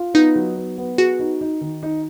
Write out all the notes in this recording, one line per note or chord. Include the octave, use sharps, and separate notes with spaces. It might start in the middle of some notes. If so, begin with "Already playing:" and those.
Already playing: F4
B3 D#4
F#3
B3
B3
F#4 G#4
D#4
D#4
D#3
D#4